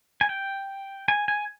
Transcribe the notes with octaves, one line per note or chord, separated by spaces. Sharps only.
G#5
G5
G#5
G#5